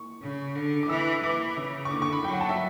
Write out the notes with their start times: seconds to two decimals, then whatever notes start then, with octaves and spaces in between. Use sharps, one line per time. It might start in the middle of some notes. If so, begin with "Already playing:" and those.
Already playing: C#6
0.22 C#3
0.55 D3
0.83 D6
0.89 E3 E6
1.23 E3 D6
1.57 C#3
1.85 C#6
1.90 D3 D6
2.02 C#6
2.13 B5
2.24 F#3 G5
2.33 F#5
2.41 A5
2.49 E5